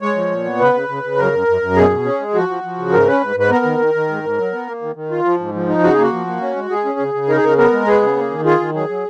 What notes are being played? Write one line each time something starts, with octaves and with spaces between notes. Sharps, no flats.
G#3 C#5
F3
A#2
B3
C#3 B4
C#3
C#3
C#3
F#2 A#4
F#2
F#2
F#2
B2 G#4
B2
C#4
G#3
F3 F#4
F3
F3
C#3
G#2 A#4
C#4 B4
G#2
G#2 B4
B3 A#4
D#3
D#3
D#3
G#2
G#2
F#3
B3
A#3
D#3
D#3
F4
F3
G#2
F3
D#4
C#3 F#4
G#4
A#3 F#4
F3
A#3
C#4
G#3
G#3 G#4
C#4
C#3
C#3
D#4 A#4
G#4
C#3 A#4
B3 A#4
G#3
B3 G#4
C#3
A#3
D#3
F4 G#4
D#3
F#3 G#4
F#3